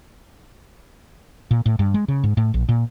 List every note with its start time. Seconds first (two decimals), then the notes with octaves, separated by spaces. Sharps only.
1.51 A#2
1.66 A2
1.79 G2
1.94 G#3
2.08 C#3
2.24 G#2
2.37 A2
2.54 A#1
2.69 A#2